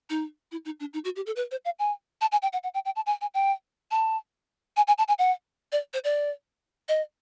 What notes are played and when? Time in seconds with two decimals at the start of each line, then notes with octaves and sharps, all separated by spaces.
0.10 D#4
0.52 E4
0.65 D#4
0.80 D4
0.94 D#4
1.05 F#4
1.16 G4
1.26 A4
1.36 B4
1.51 C5
1.65 F5
1.79 G#5
2.21 A5
2.32 G#5
2.42 G5
2.53 F#5
2.63 F#5
2.74 G5
2.85 G5
2.96 A5
3.06 G#5
3.21 G#5
3.34 G5
3.91 A5
4.77 G#5
4.88 G#5
4.98 A5
5.08 G#5
5.19 F#5
5.72 D5
5.94 C5
6.04 D5
6.89 D#5